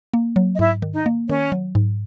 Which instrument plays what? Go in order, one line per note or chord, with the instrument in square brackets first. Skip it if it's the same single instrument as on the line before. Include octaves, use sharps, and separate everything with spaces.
[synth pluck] A#3
F#3
[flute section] D#5
[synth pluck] G#2 [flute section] E4 E5
[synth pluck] D#3
[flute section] D#4 D#5
[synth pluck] A#3
[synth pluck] D#3 [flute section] C#4 C#5
[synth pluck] F#3
G#2